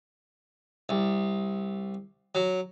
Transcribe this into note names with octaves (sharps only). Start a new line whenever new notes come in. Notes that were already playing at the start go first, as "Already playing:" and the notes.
C2
F#3